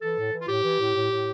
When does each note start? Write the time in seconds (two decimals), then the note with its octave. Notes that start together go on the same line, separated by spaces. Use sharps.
0.01 E3 A4
0.17 A2
0.32 E3
0.40 F4
0.48 A2 G4
0.63 E3
0.79 A2
0.95 A2
1.10 A2